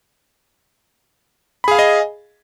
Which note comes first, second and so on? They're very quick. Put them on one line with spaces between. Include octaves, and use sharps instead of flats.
B5 G#4 F5 G#5 D#5